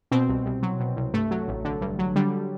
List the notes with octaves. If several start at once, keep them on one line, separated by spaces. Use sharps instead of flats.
B2 C4
C2
C2
F#3
B2
C2
G2 A3
F#3
A1
D3
G2
F#3
D3 G3